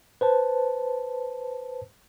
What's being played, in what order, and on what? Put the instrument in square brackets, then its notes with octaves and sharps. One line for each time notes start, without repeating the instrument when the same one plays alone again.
[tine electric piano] B4 C5 A5